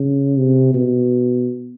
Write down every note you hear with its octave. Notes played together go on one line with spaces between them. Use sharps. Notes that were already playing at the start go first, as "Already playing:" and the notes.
Already playing: C#3
C3
B2